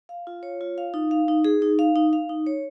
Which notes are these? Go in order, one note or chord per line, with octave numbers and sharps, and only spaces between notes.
F5
F4
C#5
F4
F5
D#4
F5
D#4
G#4
D#4
F5
D#4
F5
D#4
C#5